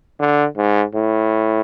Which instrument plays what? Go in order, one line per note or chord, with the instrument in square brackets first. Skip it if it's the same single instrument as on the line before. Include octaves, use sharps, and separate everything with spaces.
[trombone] D3
G#2
A2